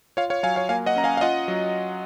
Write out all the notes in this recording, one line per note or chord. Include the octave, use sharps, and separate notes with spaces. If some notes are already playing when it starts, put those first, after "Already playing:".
F4 C#5 F5
C#5 F5
F#3 F5 G#5
C#5 F5
A#3 F5 G#5
D#5 F#5
C#4 A#5
F5 G#5
F5
F4 D#5 F#5
F#3